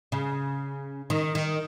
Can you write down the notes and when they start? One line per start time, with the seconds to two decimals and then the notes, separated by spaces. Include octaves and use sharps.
0.12 C#3
1.10 D#3
1.35 D#3